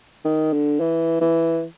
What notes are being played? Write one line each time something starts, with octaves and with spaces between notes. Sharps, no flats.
D#3
D3
E3
E3